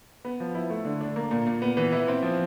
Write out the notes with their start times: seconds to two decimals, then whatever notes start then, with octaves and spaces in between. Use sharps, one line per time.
0.25 B3
0.40 F3
0.55 E4
0.70 A3
0.85 D3
1.01 D4
1.16 A#3
1.31 A#2
1.47 A#2
1.62 B3
1.77 E3
1.92 E4
2.08 C4
2.23 F3